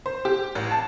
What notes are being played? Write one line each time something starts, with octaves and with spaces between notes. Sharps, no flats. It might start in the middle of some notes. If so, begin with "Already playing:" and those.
C5
G4
A1
A5